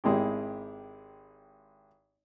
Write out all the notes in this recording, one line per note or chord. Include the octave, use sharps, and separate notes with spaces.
G#1 G#3 E4 G4